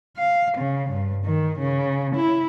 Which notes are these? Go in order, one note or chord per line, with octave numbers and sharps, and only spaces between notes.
F5
C#3
G2
D#3
C#3
E4